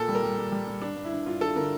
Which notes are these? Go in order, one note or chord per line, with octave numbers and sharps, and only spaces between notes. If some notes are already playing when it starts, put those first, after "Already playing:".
Already playing: A#2 A4
G3
A#4
G3
G3
G3
G3
G2 D4
G2
E4
G2
G2 F4
G2 A4
D3 A#4